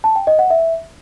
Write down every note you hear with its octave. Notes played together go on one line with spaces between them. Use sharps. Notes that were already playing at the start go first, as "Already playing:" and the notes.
A5
G5
D#5
F#5
E5